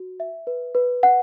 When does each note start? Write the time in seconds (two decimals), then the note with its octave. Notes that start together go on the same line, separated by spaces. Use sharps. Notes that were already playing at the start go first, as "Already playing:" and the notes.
Already playing: F#4
0.20 E5
0.47 B4
0.75 B4
1.03 F#5